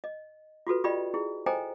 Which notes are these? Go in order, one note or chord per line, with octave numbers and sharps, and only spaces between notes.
D#5
F4 F#4 A4 B4
F4 G4 D5 D#5 G5 B5
E4 G#4
A4 C5 D#5 G5 G#5 A#5